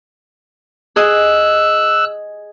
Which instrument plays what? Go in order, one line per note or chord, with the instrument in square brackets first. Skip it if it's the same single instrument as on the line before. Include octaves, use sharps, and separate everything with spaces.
[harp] G#4 D#5 [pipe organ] E6 F#6